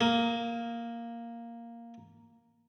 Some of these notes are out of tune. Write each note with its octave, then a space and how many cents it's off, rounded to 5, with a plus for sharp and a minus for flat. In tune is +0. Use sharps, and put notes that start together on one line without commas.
A#3 +0 D#6 +35